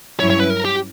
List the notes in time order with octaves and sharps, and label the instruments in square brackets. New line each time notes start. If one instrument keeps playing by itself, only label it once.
[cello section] G2 F#3 C#4 E4 [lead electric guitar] C#5
[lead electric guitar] C#5
B4
A#4
G4